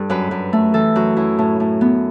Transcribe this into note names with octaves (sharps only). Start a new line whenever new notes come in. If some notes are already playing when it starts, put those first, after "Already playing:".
Already playing: G2 A4
F#2 B4
F#2
A3
E3 A4
F#2 F#4
F#2 E4
A2
A2
B3